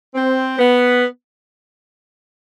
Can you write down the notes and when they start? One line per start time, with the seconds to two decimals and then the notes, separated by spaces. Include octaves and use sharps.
0.15 C4
0.59 B3